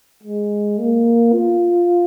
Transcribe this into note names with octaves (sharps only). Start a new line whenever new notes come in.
G#3
A#3
F4